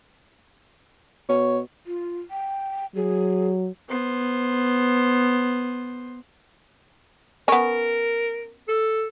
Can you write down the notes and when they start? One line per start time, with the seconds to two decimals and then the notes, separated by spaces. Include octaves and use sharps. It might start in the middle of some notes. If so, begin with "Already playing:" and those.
1.29 B2 C#5
1.87 F4
2.31 G5
2.95 F#3 G#4
3.89 B3 C5
7.48 B3 C#4 A#4
8.68 A4